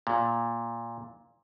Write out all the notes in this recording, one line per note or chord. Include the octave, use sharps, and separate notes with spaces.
A#2